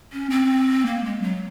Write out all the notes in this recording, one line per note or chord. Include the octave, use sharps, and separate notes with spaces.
C#4
C4
A#3
G#3
F#3